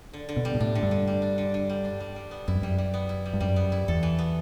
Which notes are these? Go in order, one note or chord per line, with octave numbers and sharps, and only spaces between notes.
D3
D3
B2
G3
B2
A2 D4
D3
G2
D3
G3
D4
D3
D3
G3
D4
G3
G3
B3
F#2 E4
G2
F#2 G3
G3
B3
E4
G3
G2
F#2 G3
B3
E4
E2 A4
E3
B3